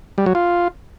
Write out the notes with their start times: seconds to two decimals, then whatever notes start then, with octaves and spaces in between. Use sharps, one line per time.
0.18 G3
0.26 F#3
0.35 F4